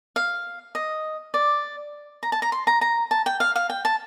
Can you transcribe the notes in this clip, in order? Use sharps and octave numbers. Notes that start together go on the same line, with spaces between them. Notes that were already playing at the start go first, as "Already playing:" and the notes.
F5
D#5
D5
A#5
A5
A#5
C6
A#5
A#5
A5
G5
F5
F5
G5
A5